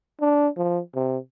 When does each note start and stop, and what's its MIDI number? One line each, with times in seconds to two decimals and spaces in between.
0.21 0.48 62
0.57 0.80 53
0.95 1.18 48